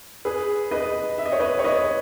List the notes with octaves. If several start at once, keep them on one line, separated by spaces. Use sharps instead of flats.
G#4 B4
B4 D#5
E5
D#5
C#5
B4 D#5
C#5
B4 D#5